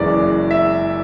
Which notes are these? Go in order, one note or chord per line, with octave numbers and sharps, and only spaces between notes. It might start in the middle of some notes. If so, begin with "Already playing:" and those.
Already playing: F#1 F#2 E3 G#3 D5
E5